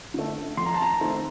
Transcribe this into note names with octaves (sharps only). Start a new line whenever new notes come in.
D3 A3
F2 C6
A#5
A5
A#5
D#3 A3 C4